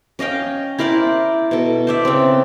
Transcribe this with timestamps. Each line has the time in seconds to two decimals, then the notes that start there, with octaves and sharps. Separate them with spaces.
0.19 C#4 D#5 F5 G5
0.79 E4 A#4 C5 D5
1.51 B2 A4
1.87 C5 D5 E5
2.05 C#3 C4